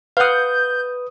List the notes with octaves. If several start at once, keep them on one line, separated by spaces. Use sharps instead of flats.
B4 F5 F#5 D#6 G6